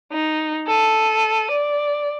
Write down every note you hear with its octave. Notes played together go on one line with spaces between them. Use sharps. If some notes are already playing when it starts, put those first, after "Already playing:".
D#4
A4 D#7
D5